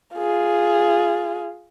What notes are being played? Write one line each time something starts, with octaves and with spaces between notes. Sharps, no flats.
F4 G#4